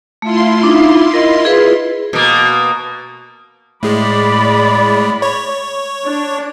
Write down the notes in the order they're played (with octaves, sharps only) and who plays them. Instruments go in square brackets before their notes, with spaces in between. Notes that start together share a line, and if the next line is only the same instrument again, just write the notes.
[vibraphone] A3 [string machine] E4 F4 C6
[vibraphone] D4 D#4
A#4 D#5
G#4 B4
[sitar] B2 A#3
[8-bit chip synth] A2 G#3 [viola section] D5 B5
[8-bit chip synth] C#5
[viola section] D4